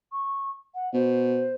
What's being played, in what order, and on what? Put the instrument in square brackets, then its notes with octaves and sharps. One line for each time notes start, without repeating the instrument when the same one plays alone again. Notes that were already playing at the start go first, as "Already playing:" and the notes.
[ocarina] C#6
F#5
[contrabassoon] B2 [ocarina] C5